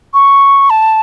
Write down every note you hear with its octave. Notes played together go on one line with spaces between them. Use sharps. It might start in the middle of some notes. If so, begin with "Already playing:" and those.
C#6
A5